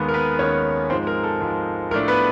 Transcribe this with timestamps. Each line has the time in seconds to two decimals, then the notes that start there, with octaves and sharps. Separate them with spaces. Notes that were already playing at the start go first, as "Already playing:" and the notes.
Already playing: D#2 D#3 G#3 B3
0.09 A#4
0.14 B3 B4
0.39 D#2 D#3 G#3 B3 C#4 C#5
0.90 G#2 F3 G#3 C4 C5
1.07 A#4
1.23 A4
1.40 G#2 F3 G#3
1.91 A2 F3 A3 D4 A#4
2.08 B3 B4